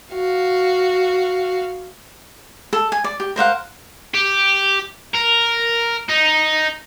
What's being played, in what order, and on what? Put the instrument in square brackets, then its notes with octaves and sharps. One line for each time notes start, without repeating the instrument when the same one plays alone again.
[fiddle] F#4 F5
[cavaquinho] A4
G#5
D5
G4
A#4 C5 F5 F#5
[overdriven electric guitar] G4
A#4
D#4